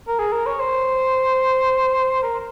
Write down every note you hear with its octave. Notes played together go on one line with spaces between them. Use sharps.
A#4
G#4
A#4
C#5
C5
A#4